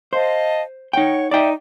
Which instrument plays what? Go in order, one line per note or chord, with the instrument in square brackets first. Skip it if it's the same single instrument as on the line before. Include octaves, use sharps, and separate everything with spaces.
[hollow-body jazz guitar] C5 [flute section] D#5 F5 A5
[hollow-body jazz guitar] D#4 G5 [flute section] C#5 F#5 C#6
[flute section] D#4 [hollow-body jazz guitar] D5 E5 G5